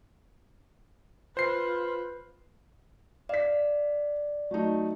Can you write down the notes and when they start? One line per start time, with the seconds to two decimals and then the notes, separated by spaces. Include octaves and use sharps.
1.37 F4 B4 C5 C7
3.29 D5 F5 B6
4.51 F#3 A3 D#4